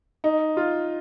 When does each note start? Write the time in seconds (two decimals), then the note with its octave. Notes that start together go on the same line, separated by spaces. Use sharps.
0.24 D#4
0.57 F4